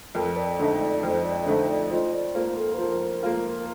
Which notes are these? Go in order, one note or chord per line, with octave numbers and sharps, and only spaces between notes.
F2 A#4
D5
D3 A3 D#4
D5
F2 C5
D5
D3 A3 D#4 C5
D5
F3 D#5
D5
A#3 F4 C5
A4
C5
F3 A#4
A#3 F4